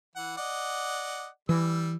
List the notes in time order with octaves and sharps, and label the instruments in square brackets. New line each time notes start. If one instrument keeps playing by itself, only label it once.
[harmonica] E3 F#5
D5 D#5 F#5
[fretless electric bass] E3 [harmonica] G3 E6